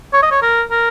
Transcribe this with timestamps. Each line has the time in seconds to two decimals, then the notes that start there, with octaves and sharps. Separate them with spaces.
0.13 C#5
0.23 D#5
0.31 C#5
0.42 A#4
0.71 A#4